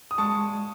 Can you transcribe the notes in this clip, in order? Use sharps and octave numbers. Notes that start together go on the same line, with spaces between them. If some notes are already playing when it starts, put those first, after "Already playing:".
D#6
G#3 A5 C#6